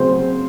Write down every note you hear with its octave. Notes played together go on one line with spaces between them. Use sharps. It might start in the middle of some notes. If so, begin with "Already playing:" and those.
Already playing: C#3 F#3 C4 C5